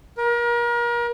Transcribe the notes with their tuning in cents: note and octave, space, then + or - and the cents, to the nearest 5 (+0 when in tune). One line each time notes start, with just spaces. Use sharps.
A#4 +35